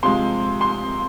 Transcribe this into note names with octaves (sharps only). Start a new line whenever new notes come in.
C3 F3 G#3 C6
C6